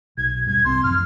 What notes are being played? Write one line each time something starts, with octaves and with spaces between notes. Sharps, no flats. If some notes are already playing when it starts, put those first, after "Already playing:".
B1 G#6
D#1 G2 G#6
C2 C4 C6
A1 F#2 F3 F6